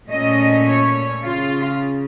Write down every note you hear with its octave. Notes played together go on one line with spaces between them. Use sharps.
A#2 A3 C#4 D#5
C#5
C#3 F4